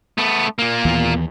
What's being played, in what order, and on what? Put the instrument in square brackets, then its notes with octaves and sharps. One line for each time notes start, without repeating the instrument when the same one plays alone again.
[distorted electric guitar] A3 B3
A#2 A#3
[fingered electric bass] D#2 E3 B3